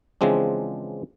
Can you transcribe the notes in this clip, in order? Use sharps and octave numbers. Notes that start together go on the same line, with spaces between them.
C#3 E3 F3 G#3 C4 D4